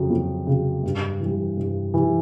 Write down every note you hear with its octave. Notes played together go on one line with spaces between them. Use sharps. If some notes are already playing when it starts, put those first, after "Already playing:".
Already playing: F2 C#3 F#3
F2
C#3 F#3
G2
E3 G3
G2
E3 G3